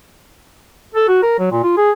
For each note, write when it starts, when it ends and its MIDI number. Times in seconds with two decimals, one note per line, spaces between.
0.94 1.08 69
1.08 1.21 66
1.22 1.38 70
1.39 1.50 54
1.52 1.60 46
1.64 1.73 65
1.77 1.91 68